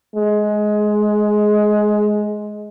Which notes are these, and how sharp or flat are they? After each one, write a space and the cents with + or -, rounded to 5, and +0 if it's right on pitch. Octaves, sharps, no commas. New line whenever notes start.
G#3 +15